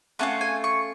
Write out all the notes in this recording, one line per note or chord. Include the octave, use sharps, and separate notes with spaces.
A3 C#4 F4 F#5
G#5
C#6